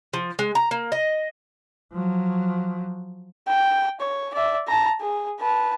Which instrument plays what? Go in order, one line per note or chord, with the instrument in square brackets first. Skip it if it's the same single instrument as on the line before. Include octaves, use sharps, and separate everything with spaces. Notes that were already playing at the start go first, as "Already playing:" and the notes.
[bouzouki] F3
G#3
A#5
A#3
D#5
[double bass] F3 F#3
[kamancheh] G5
C#5
D5 E5
A5 A#5
G#4
B4 A5